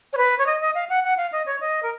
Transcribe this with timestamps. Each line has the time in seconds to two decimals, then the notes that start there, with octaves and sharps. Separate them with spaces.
0.13 C#5
0.17 B4
0.38 C#5
0.47 D#5
0.61 D#5
0.75 F5
0.90 F#5
1.04 F#5
1.17 F5
1.33 D#5
1.46 C#5
1.60 D#5
1.83 A#4